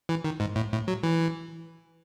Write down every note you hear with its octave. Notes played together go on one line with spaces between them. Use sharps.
E3
D#3
G#2
A2
A2
F#3
E3